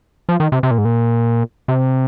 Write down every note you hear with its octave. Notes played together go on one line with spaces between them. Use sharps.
F3
D#3
C3
C3
A#2
G#2
A#2
C3